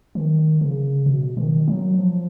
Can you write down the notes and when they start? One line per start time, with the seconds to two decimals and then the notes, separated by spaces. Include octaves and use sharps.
0.15 D#3
0.61 C#3
1.06 B2
1.37 D#3
1.68 F#3
1.98 F3